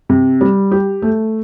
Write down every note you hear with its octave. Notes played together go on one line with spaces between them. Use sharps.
C3
G3
G4
A3